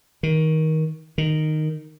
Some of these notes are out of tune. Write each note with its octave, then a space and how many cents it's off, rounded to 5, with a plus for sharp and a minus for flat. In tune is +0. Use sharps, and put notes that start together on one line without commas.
D#3 +20
D#3 -10